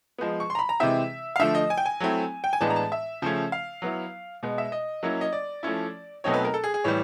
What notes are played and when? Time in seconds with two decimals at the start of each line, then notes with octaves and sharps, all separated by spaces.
0.18 F3 G#3 B3
0.40 C#6
0.50 C6
0.55 A#5
0.59 B5
0.69 A#5
0.80 C3 E3 G#3 C4 E4 E5
1.36 F5
1.39 D3 F3 A3 E5
1.55 D#5
1.70 G#5
1.77 G5
1.86 G#5
2.00 F#3 A3 C4 E4
2.44 G5
2.53 G#5
2.61 A2 E3 G#3 B3 D4 A5
2.70 A#5
2.76 A5
2.92 E5
3.22 C#3 F3 A3 C#4
3.52 F5
3.82 F#3 B3 E4
4.43 B2 G#3 B3
4.58 E5
4.72 D#5
5.03 F#3 A#3 C#4 E4
5.21 D#5
5.33 D5
5.63 F3 A3 C#4 E4
6.24 B2 F#3 A3 C4 D#4 C#5
6.34 B4
6.45 A#4
6.54 A4
6.64 G#4
6.74 G#4
6.84 A2 E3 G3 C#5